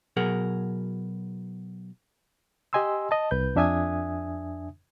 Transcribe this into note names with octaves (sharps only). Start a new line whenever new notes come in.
B2 F#3 G#4 A#4 F#5
G4 D#5 G#5 C6 E6
D#5 A5
C2 B4 G6
F2 D4 E5 G#5 D#6 G#6